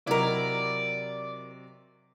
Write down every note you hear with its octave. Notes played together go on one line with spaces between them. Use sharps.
C3 F#3 E4 A#4 D5 D#5